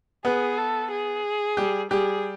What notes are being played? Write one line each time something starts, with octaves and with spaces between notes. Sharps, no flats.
B3 G#4 B4
A4
G#4
G3 G4
G3 G4 G#4